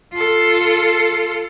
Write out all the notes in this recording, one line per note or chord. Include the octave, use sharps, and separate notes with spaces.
F4 A4